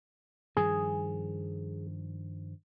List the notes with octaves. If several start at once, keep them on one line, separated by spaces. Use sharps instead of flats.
G2 D#3 F3 G#4